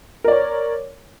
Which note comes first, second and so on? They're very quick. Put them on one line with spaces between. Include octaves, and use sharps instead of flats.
A#4 D5 C#5